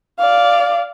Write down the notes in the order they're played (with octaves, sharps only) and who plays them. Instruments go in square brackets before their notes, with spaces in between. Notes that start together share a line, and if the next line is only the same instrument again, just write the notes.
[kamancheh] D5 F5